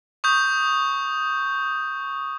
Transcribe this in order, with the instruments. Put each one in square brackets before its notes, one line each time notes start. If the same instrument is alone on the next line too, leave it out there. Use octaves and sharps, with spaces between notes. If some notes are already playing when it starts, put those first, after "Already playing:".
[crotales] C#6 D#6 G6